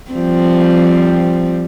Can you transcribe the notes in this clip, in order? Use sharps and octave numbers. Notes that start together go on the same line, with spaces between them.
F3 G3 C4